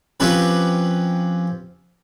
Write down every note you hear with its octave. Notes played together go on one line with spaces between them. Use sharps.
F3 C4 C#4 G4 B4